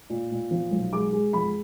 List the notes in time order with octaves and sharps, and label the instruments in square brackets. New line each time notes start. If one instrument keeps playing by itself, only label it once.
[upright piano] A#2
A#2
F3
B1
G#3 D6
G#3
F2 B5